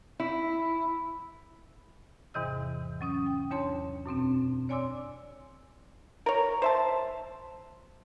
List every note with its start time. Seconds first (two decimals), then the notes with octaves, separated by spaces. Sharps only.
0.20 E4
2.34 E2 G#2 C3 E3 D#5 E6
3.01 F#3 C#4 D#6
3.26 G5
3.51 E2 D4 C#5 A5 C6
4.06 F#2 B2 C4 D4
4.69 C#5 D5 G#5 C6 D6 E6
6.26 A#4 C#5
6.62 C5 E5 A5